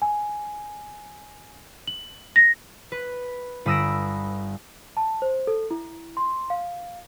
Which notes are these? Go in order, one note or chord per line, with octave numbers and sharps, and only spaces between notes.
G#5
F#7
A#6
B4
G1 B5 D#6 E6 A#6 D7
A5
C5
A4
E4
C6
F5